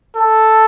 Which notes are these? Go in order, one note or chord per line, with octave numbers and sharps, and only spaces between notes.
A4